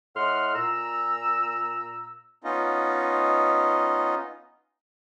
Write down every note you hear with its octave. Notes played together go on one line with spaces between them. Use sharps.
A2 D#5 F#5 C6 F6
A#2 A#5 E6
B3 C#4 D#4 F4 D#5